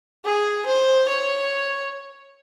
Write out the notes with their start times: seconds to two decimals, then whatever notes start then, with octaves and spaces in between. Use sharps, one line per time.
0.25 G#4
0.67 C5
1.08 C#5